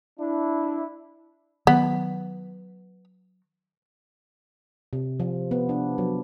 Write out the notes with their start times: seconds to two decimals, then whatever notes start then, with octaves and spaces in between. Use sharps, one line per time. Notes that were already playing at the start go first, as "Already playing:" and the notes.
0.19 D4 E4
1.67 D#3 F#3 B3
4.93 C3
5.20 F3
5.51 B3
5.69 D4
5.98 F#3